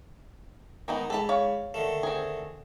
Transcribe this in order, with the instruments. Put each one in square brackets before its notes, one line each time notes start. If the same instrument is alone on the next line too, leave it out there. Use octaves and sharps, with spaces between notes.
[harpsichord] D#3 [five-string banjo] G#3 B3 D#4
[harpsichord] G#2 B5 [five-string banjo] A4 A5
[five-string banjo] C#5 F5
[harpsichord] D3 D#3 A3
[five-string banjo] C4 G#4